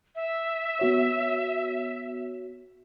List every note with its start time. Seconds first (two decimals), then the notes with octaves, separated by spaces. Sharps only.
0.15 E5
0.79 B3 F#4 C#5